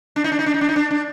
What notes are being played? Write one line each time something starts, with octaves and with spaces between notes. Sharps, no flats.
D4
D#4
D4
D#4
D4
D#4
D4
D#4
D4
D4